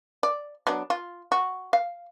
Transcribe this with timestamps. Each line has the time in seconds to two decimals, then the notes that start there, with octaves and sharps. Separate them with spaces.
0.23 D5
0.67 F#3 B3 D4
0.90 F4
1.32 F#4
1.73 F5